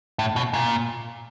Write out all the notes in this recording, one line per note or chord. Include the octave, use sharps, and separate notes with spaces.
A2
B2
A#2